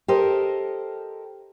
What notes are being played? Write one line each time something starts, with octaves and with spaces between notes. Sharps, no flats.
G4 A4 A#4 C5 D#5